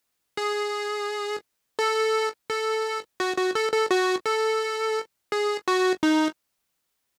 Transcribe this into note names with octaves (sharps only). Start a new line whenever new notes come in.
G#4
A4
A4
F#4
F#4
A4
A4
F#4
A4
G#4
F#4
D#4